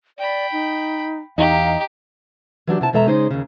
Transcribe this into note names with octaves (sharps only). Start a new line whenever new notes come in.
D5 G5 B5
D#4
E2 D#4 G4 F5 A#5
E3 F#3 D4 G4
C3 E4 A5
E2 B2 G#3 A4 E5 A#5
C#3 G#3 D#4 G#4 C5
D#2 C#3